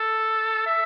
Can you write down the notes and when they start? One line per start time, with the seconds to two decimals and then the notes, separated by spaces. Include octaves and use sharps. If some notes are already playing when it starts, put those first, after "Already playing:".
Already playing: A4
0.67 E5